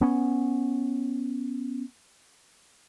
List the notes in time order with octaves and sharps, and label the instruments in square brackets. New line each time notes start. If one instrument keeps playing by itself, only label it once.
[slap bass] B3 C#4